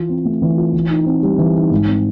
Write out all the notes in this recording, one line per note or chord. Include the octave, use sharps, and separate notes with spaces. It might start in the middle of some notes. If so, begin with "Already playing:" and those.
Already playing: E3 F4
C4
A3
E3
F4
E3
D#4
C4
G3
E3
D#4
G#2
C4